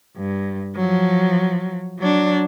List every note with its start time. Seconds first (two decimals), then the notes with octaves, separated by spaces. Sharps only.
0.17 G2
0.76 F3 F#3
1.99 F#3 D4